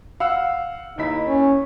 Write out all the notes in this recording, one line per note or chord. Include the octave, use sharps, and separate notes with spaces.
F5 F#5 E6
D#2 D#4 E4 B6
C#4